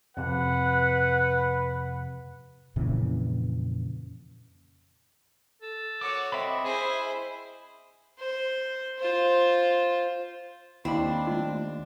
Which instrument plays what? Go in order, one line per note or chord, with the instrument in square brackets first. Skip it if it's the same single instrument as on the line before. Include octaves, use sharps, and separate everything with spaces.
[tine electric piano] F2 C3 [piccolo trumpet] B4 [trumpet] F#5
[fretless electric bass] F2 A#2 C#3 E3
[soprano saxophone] A4
[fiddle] F#4 C#5 [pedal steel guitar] D6
[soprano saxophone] C4 [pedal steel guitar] D#5 E5 B5
[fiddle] E4 C5 [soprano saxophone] G#4
[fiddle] C5
F4 C5
[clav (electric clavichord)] D#2 [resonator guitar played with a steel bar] C4 [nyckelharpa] D4 [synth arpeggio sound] E4 B5
[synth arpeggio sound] A3 F4